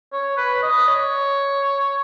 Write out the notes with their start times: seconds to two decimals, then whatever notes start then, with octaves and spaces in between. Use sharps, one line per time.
0.13 C#5
0.37 B4
0.62 D#5
0.88 C#5